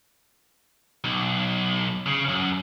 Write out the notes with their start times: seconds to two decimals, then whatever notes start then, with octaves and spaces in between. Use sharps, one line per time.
1.04 B1
2.06 C#3
2.29 F#2